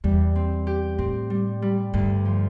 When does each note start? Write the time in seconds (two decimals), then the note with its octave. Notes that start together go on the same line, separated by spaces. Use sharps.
0.04 E2 G3
0.36 C4
0.67 G4
0.98 A2 C4
1.30 G3
1.62 G3
1.94 D2 G2
2.25 F3